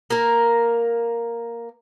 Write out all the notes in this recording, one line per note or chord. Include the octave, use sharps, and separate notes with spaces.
A#3 A#4